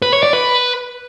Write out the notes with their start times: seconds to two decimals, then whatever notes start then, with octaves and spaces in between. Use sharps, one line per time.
0.02 B4
0.13 C#5
0.23 D5
0.33 B4